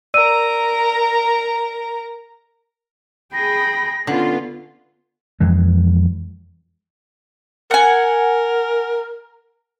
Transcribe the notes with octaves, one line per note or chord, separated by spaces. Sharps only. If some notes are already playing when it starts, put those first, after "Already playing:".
A#4 D5 A#5 E6 D#7
G#4 G5 B5 A#6
D3 B3 C#4 F4
F2 E3 G#3
A#4 F#5 G#5